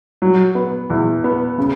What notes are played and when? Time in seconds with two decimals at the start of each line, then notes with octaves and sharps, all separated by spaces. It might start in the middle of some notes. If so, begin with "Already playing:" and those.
0.22 F#3
0.55 B3
0.90 E2
1.24 B3
1.58 C#3